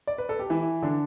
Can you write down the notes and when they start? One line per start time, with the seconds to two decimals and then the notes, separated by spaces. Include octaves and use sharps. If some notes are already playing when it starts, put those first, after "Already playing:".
0.07 D5
0.18 B4
0.29 A4
0.39 G4
0.50 E3 E4
0.83 D3 D4